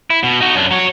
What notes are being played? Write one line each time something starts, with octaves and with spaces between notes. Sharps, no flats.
E4
B2
D#4 F#4
F#2 D4
F#3 C#5